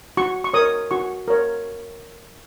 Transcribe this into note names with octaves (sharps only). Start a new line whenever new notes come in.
F#4 C#6
C#6
A#4 C#5 D#6
F#4 C#6
A#4 C#5